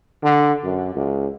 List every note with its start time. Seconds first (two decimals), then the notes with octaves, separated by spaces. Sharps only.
0.23 D3
0.64 F#2
0.95 C#2